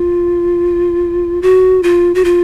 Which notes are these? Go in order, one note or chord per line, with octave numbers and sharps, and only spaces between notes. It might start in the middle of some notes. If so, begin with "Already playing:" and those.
Already playing: F4
F#4
F4
F#4
F4